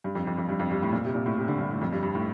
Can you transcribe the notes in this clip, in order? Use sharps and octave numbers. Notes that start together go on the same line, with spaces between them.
G2
F2
F2
F2
G2
F2
G2
A2
A#2
C3
A#2
A2
C3
D3
G2
A2
F2
G2
G2
A2